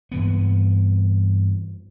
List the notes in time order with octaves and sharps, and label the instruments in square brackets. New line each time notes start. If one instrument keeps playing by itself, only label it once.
[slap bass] G2 E3 B3